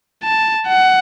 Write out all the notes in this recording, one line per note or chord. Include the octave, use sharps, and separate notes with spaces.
A5
F#5